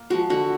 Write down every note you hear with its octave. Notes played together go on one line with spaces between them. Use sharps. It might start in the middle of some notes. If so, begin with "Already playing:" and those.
Already playing: A#3
F3 G#3 F#4
D3 F#4